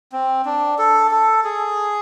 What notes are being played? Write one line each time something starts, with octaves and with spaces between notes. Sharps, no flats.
C4
D4
A4
A4
G#4